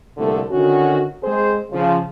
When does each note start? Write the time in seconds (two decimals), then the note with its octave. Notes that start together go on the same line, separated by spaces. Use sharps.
0.17 C2 G2 A#2 D3 A3
0.51 D3 D#3 C#4 F#4
1.23 G#3 C4 G#4 C5
1.72 C#3 F3